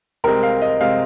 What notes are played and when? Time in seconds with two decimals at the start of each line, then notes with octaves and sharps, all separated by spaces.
0.24 C2 C3 G#3 C4 A#4
0.43 F5
0.62 D#5
0.80 C3 G#3 C4 F5